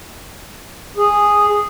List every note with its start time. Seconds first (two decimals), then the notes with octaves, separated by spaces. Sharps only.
0.97 G#4